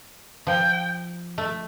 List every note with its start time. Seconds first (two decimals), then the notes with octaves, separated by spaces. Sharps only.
0.47 F3 G5
1.38 A3